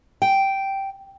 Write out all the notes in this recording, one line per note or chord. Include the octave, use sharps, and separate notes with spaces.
G5